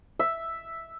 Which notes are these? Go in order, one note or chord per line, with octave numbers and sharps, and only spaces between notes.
E5